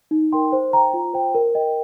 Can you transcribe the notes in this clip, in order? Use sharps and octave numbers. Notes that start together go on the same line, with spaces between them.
D#4
A#4 G5 C6
C5
G5 A#5
F4
C5 G5
A#4
D#5 G5